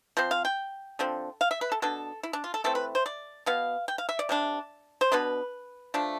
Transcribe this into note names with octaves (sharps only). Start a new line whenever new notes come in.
F3 C4 C5
F5
G5
D3 F3 C4
F5
E5
B4
A4
B2 B3 D4 A4
E4
D4
F4
A4
E3 A3 C4 A4
B4
C5
D5
B2 B3 F5
G5
F5
E5
D5
C3 G3 D4
C5
B2 B3 D4 B4
F3 A3 D4